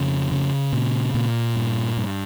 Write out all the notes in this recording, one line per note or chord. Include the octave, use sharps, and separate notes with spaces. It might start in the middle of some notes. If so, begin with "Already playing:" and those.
Already playing: F2 C#3
C#3
A#2
A#2
G2
G2